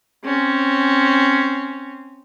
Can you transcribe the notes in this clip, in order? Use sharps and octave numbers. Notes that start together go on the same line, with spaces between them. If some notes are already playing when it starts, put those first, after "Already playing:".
C4 C#4